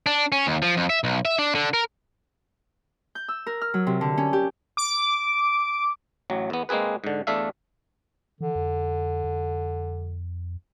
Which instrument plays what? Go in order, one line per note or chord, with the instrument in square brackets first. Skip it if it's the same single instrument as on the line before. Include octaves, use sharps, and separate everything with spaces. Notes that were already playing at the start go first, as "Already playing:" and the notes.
[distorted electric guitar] D4
C#4
D#2
F3
F2
E5
B1
E5
D4
D3
A#4
[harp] G6
E6
A#4
F6
F#3
C3
D3
C#4
G4
[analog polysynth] D6
[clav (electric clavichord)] A1 F#3
E2 B3
G#3 A#3 C4 G#4 B4
G#2 D3
E2 A3 D4 E5 F5
[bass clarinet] D3 [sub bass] E3
[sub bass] F2
F2